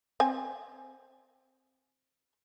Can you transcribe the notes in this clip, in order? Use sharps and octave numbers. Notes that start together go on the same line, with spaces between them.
C4 G#5